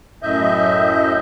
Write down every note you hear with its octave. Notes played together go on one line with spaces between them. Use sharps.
F#2 A2 D#5 E5 G6